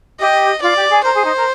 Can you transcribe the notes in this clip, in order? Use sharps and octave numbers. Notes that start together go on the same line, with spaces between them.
G4 D#5
F4 D5
G4
G#4
A#4 C5
G#4
D#4
A#4